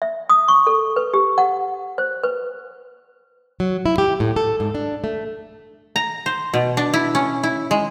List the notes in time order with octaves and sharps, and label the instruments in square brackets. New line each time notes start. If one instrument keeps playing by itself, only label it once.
[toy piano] E5
D#6
C#6
A4
B4
G4
F#5
C5
B4
[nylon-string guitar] F#3
E4
G4
A2
A4
G#2
D4
A3
[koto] A#5
C5
B2
D4
E4
C#4
E4
G#3